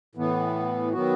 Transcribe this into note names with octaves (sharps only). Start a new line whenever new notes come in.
A2 E3 B3
D#3 F#3 B3 F#4